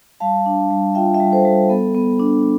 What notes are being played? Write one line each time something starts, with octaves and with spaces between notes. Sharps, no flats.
G3 F5 A5
D4
G3
F4 E5 G5
E5 G5
G3
A4 C5
G3
B3 A4
B3
D4